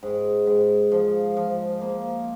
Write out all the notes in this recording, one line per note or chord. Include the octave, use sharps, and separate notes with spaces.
G#2
G#2
F3
F3
A#3